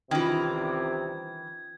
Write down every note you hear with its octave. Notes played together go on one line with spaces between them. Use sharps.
C2 C3 D#3 E3 C#4 F4 G#6